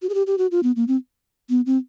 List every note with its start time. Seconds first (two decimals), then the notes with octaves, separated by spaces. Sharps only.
0.02 F#4
0.09 G#4
0.14 G4
0.27 G4
0.38 F#4
0.51 F4
0.63 B3
0.76 A#3
0.88 C4
1.50 B3
1.66 C4